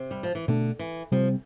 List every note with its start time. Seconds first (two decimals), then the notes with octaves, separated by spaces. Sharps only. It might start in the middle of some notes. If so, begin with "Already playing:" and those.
Already playing: C3
0.11 G3
0.23 F3
0.35 E3
0.48 B2 D3 A3 D4
0.79 E3
1.12 C3 F3 G3 C4